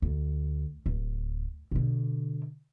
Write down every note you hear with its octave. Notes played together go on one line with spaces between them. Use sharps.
D2
D1
B2 D3